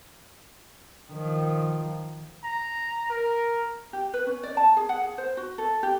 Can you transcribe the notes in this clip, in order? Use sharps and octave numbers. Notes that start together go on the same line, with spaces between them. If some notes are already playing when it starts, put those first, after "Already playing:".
D#3 F3
A#5
A#4
G4
B4
C#4
D5
A5
G#4
F#5
G#4
C5
F#4
A4
G4